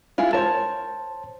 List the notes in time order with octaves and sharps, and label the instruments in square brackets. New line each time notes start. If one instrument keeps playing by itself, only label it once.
[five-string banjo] G#3 E4 F4
[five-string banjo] A#4 C#5 [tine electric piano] C5 A5